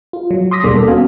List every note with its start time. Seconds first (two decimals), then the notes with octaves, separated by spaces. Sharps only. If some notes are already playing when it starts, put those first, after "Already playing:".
0.13 F4
0.31 F#3
0.51 C6 D6 D#6 A#6 B6
0.63 D#2 B2 G3 A#3 D4 G#4
0.75 A4
0.88 B3 C#4 F#4 F5 G#5